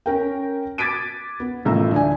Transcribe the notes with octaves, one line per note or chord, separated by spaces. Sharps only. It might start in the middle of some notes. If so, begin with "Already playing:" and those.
C#4 A#4 G5
D6 G#6 A6 B6 D7 D#7
B3
A1 A2 D#3 F3 A#5 E6
D2 D4 G#5